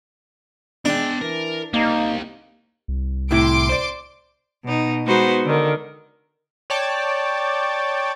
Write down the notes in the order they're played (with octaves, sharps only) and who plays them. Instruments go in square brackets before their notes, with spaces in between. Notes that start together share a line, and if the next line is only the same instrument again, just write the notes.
[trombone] G#3 [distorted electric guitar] B3 G5 [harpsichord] D4
[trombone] E3 [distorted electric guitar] A#4
[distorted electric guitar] G3 C4 [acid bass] A#3 [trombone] D#4
[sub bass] C2
[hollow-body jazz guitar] A2 C3 E4 [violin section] C6 D6 D7
[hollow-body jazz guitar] C5 D5
[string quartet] B2 D#4
G#3 B3 D#4 F#4 B4 C5
D3 D#3
[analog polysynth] C#5 D5 G5 A5 D6